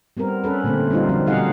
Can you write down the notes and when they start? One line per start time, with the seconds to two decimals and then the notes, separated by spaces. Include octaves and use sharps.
0.17 G3 B3 C4 A#4
0.44 C#4 A4 B4
0.64 A#2 D3 A3 A#3 C4
0.90 G3 C4 D#4 F4
1.09 D3 F3 F#3 C4 F4
1.26 B2 G3 D#4 G#4 F5 F#5